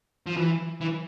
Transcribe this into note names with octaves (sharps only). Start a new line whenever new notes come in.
F3
E3
E3